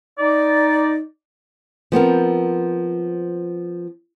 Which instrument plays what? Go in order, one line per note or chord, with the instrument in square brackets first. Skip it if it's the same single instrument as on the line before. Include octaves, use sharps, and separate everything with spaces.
[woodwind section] D#4 D5
[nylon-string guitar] F3 B3 C4 A#4